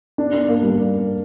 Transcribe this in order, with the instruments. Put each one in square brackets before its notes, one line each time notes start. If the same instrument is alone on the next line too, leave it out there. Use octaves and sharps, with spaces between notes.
[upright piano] D4
D4
A#3
G3